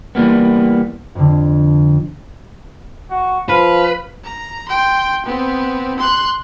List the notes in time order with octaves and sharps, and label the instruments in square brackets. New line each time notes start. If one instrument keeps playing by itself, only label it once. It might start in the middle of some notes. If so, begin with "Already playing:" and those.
[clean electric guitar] E3 G3 A#3 B3
[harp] F2 D3
[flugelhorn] F#4
[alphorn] F3 [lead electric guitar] B4 [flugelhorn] F5
[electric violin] A#5
G5 C6
B3 C4
C6 F#6